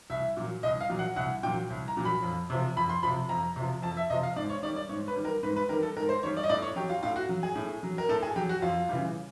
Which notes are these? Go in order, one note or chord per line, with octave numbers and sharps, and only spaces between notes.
C2 E5
A#2 F#3
C2 D#5
F5
A#2 F#3
F#5
C2 F#5
A#2 F#3 G5
C2
A#5
A#2 F#3
B5
F2
C3 F3
F2 B5
C6
C3 F3 B5
F2 A#5
C3 F3
F2 A5
E5
C3 F3 D#5
F5
G#2 D5
C#5
D#3 G3 D5
D5
G#2 C#5
B4
D#3 G3
A#4
G#2 B4
B4
D#3 G3 A#4
A4
G#2 A#4
C5
D#3 G3 C#5
D5
D#5
A2 D5
C#5
F#3 G4
F4
A2 F4
F#4
F#3
G#4
A2
F#3
A#4
A2 A4
G#4
F#3 G4
F#4
F2 F4
C#3 E3 G3